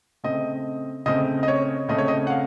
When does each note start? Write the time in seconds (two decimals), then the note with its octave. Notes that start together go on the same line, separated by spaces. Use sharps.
0.24 C#3 A3 C4 D#5
1.06 C#3 A3 C4 D#5
1.43 D#5
1.48 C#5
1.89 C#3 A3 C4 D#5
1.98 C#5
2.08 D#5
2.27 F#5
2.30 F5